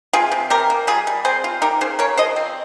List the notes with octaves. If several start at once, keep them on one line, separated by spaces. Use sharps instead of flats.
C3 F4 G#4
C3
C3 G4 A#4
A#3
G3 F4 G#4
G3
C4 G#4 C5
F4
D#4 G4 A#4
C#3 G#4 C5
C#3 A#4 C#5
F3 C5 D#5
C4